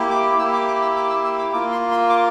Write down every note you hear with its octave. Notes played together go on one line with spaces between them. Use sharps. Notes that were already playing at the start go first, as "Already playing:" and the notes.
Already playing: A#3 E4 G4
D6
A#3 E4 G4 E6
D6
D6
E6
D6
E6
E6
D6
A#3 F4 D6
C6
C6
D6